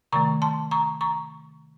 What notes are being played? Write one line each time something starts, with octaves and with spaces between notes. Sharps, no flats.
C3 D#3 A3 A#5 C#6
A5 C6
A#5 C#6
A#5 C#6